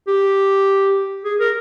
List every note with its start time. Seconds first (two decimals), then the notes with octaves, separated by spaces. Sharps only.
0.08 G4
1.25 G#4
1.40 A#4